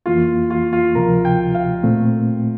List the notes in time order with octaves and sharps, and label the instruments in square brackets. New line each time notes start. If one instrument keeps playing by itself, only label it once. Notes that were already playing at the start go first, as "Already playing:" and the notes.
[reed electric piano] F2 E3 A#3 E4 [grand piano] F4
[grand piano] F4
F4
[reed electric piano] D2 C3 F3 [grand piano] A#4
[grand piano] G5
F5
[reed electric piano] A#2 A3 C4